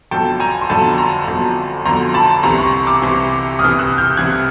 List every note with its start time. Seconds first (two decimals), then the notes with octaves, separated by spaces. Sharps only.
0.11 G1 F2 D3 F#3 G5 A5
0.40 G#5 A#5
0.61 C6
0.69 G1 F2 D3 F#3 A5 B5
0.98 A#5 C6
1.27 G1 F2 D3 F#3
1.85 G1 F2 D3 F#3 A#5 C6
2.14 A5 B5
2.43 C2 C3 E3 A#5 C6
2.58 B5 C#6
2.87 D6 E6
3.02 C2 C3 E3
3.59 C2 C3 E3 D#6 F6
3.79 E6 F#6
3.98 F6 G6
4.17 C2 C3 E3 F#6 G#6